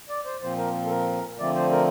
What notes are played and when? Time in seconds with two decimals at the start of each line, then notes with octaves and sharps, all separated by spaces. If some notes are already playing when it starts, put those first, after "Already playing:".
0.09 D5
0.25 C5
0.41 A#2 F3 C4 C5
0.58 A#4
0.85 A4
0.90 A#4
1.39 D3 F3 A3 C4 D5
1.55 C5
1.72 A#4